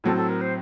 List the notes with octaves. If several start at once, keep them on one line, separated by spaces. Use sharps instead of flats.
A2 F#3 C4 A4
A4
A#4
C5